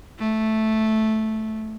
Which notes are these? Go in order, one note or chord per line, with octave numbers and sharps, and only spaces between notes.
A3